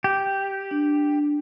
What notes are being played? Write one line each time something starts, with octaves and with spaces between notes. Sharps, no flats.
G4
D4